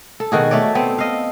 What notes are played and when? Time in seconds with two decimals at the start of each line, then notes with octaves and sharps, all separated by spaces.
0.20 A4
0.32 B2 D#3 F#4 G#4
0.51 A3 A4 C#5 D5
0.75 B3 C4 A4
0.98 D#5 F5